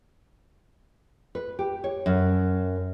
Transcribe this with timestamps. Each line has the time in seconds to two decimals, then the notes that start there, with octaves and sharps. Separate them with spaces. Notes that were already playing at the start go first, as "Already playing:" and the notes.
1.35 B4
1.59 G4
1.84 C#5
2.06 F#2